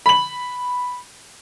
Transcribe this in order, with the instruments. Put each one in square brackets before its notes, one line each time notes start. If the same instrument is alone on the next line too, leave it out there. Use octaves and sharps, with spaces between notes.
[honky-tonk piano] B5 F#7